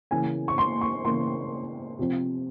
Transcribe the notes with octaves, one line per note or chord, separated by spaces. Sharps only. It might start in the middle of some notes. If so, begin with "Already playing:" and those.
C#3 E3 A#3 G#5
C#6
C6
C#6
C#3 E3 A#3 C6
C3 F3 C4